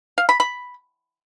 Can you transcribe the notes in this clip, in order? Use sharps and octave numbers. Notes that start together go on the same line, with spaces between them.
F5
B5
B5